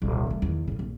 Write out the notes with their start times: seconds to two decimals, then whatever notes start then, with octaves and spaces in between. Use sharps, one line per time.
0.02 D#1 C2
0.27 G#3 A3
0.42 E2 D#3
0.68 A2 C#3
0.79 A#1